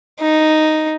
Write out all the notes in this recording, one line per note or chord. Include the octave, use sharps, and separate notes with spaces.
D#4